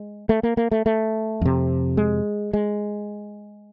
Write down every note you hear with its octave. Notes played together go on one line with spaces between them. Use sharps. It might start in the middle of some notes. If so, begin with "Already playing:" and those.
Already playing: G#3
A3
A#3
A#3
A3
A3
F2 C3
G#3
G#3